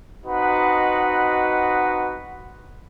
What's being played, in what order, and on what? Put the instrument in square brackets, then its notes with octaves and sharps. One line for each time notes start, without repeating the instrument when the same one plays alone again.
[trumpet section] C4 D#4 F#4 B4 D#5 F#5